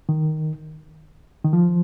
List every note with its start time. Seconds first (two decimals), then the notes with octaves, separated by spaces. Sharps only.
0.09 D#3
1.45 D#3
1.53 F3